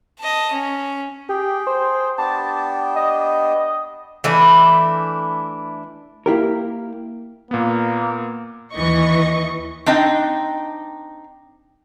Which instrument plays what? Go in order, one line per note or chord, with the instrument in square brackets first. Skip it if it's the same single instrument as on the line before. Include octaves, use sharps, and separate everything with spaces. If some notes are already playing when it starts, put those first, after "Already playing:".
[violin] D#5 A5
C#4
[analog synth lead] G4 [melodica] G#4 G5
[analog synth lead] C5
[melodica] B3 D4 G4 [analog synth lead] A5
[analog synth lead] D#5
[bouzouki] E3 A3 D4 E4
[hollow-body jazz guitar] A#3 E4 G4 A#4
[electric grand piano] A#2 B3 [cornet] A#3
[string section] D#2 E3 D#5 C#6
[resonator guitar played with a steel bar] C4 D4 D#4 D#5 G5